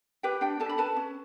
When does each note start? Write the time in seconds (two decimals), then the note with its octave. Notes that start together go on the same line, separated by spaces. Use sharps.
0.23 G4 B4 G5
0.41 D4 G4 G5
0.60 D4 A4 A5
0.69 B5
0.78 A4 B4 A5
0.96 C#4